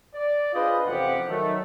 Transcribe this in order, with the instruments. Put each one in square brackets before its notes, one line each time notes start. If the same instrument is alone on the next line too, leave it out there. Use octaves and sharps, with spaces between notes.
[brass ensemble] D5
D4 F4 G#4 B4 C5 D#5
A1 F2 C3 F3 G4 F#5
D#3 F#3 A3